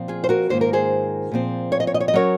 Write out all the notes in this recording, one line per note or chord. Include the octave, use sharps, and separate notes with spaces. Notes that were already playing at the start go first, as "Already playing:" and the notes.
Already playing: A#2 F3 C4
F4 G#4
C5
F#4 A#4
G#2 D#3 A#3 F4 C5
A#4
G#4 C5
A#2 F3 C4
C#5
D#5
C#5
D#5
C#5
D#5
F#3 C#4 A#4 C#5